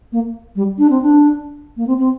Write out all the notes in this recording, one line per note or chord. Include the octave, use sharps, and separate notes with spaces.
A#3
G3
D4
C4
D4
A#3
C4
C4